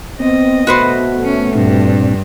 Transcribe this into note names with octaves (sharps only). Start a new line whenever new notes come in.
B3 C4 D#5
B2 A3 F#4 B4 C5
C#4
G2 A#2 C4 D4